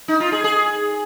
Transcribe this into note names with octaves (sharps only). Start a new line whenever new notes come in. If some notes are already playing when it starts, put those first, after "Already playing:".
D#4
F4
G#4
G#4